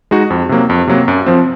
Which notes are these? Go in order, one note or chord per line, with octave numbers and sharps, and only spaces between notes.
G#3 D#4 F#4
F2
C3 F#3 A#3
F2
C3 F#3 A#3
F#2
F3 C4